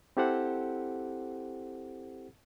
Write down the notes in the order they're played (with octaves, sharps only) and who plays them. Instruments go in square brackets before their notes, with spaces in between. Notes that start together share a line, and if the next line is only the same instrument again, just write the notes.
[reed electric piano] C4 E4 G4 A4 C5 F#5